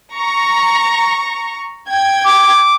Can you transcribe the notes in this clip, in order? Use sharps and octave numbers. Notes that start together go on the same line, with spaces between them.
A#5 C#6
G5 G#6
D6